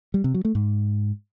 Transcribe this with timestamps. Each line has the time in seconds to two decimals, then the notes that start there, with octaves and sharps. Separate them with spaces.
0.14 G3
0.24 C3
0.34 F#3
0.45 A3
0.55 G#2